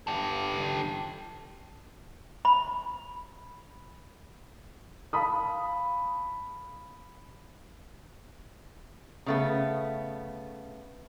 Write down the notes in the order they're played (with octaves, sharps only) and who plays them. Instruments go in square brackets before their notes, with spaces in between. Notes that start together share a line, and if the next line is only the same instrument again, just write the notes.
[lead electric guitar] G4 A4
[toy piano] B5
[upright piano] F5 A5 B5 D#6
[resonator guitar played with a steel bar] C#3 A3 B3